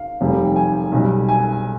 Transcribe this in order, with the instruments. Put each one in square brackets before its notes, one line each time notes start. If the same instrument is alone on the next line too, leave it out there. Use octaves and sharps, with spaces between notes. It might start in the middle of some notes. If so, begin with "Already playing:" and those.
Already playing: [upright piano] F5
F1 F2 D#3 G3
G5
G#5
B1 B2 G3
G#5